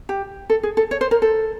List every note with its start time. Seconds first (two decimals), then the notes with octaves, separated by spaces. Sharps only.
0.09 G4
0.50 A4
0.63 G#4
0.77 A4
0.91 C#5
1.01 C5
1.11 A#4
1.22 A4